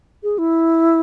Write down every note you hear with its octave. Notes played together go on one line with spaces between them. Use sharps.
G#4
E4